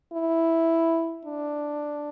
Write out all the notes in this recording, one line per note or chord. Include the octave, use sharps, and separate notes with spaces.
E4
D4